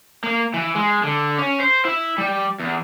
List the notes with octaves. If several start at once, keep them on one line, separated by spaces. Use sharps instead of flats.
A#3
E3
G#3
D3
C#4
C5
E4
G3
E2